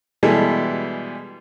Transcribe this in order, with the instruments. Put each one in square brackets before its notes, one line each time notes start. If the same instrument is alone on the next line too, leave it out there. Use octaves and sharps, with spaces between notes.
[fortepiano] B2 E3 G3 G#3 E4 A4